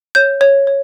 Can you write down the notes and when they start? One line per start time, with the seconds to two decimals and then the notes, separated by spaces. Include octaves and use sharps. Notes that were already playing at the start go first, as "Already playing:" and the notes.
0.15 C#5 G6
0.41 C#5
0.67 C#5